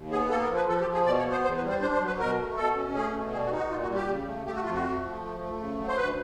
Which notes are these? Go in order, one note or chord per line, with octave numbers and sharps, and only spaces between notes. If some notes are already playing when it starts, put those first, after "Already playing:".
Already playing: D#2
B3 G#4
A#3 A4
A#4
F3
B4
F3 A4
G4
F3
G#4
B2 D5
C#5
B3
C5
E2 C5
B4
G3
C5
D4 C5
C5
F#3
B4
B2 A#4
A3
B2 A4
C#4
A3 G#4
B2
G3 G#4
F#4
D#4
F#4
A#2 F4
F#4
G3
G4
C#3
A3
A3 G4
F#4
F2 F4
F#4
A3
F3
A3
A3
C#3
F#3
C5
D2 B4